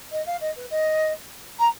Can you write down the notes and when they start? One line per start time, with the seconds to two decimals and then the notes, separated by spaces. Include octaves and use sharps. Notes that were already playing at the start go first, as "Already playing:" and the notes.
0.11 D#5
0.26 F5
0.41 D#5
0.56 B4
0.70 D#5
1.59 A#5